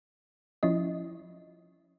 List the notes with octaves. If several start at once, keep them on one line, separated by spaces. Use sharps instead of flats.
F3 C#4 E4 D#5